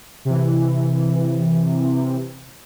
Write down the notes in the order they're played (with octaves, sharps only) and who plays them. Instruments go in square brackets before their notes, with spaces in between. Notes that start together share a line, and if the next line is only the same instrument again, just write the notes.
[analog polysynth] C3 E3